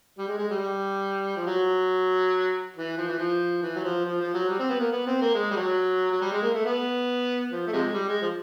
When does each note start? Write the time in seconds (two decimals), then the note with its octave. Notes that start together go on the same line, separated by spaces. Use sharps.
0.18 G3
0.28 G#3
0.39 G#3
0.51 G3
1.37 F3
1.47 F#3
2.77 E3
2.98 F3
3.08 E3
3.19 F3
3.62 E3
3.76 F#3
3.84 F3
4.05 F3
4.20 F3
4.34 F#3
4.49 G3
4.59 C4
4.70 B3
4.80 A#3
4.92 B3
5.07 C4
5.21 A#3
5.34 G#3
5.51 G3
5.56 F#3
6.11 F#3
6.21 G3
6.32 G#3
6.42 A#3
6.54 A3
6.65 B3
7.50 F3
7.67 A3
7.73 C3 F3 G#3
7.93 G3
8.08 G#3
8.22 F3